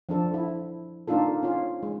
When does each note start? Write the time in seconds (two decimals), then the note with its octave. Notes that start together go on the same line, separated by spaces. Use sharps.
0.09 F3 D4 A4
0.34 E4
1.08 A#3 D4 D#4 F4 A4
1.43 C#4 F4
1.83 G#3